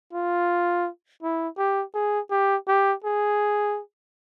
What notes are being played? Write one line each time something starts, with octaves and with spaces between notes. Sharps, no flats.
F4
E4
G4
G#4
G4
G4
G#4